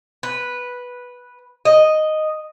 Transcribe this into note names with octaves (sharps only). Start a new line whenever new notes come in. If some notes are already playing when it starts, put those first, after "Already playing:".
B4
D#5